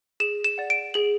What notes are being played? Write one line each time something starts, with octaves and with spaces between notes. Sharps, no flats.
G#4 E7
E7
D5 F#5
D7
G#4 F#7